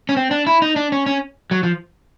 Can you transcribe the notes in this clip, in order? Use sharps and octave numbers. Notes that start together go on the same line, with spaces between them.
C#4
C4
D4
E4
D#4
D4
C#4
C#4
F#3
F3